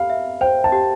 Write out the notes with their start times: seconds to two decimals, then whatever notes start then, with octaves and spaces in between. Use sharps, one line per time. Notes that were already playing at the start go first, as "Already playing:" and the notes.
Already playing: G4 F5 B5
0.10 E5
0.41 C5 G5
0.64 A5
0.72 G4